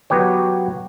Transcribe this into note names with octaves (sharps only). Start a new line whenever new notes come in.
F#3 B3 F#4 G4 C#5